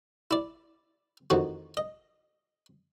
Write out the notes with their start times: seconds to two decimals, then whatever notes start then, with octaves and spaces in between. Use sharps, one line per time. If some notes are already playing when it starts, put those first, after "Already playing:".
0.31 E4 D5
1.30 A1 F2 D#3 F#4
1.77 D#5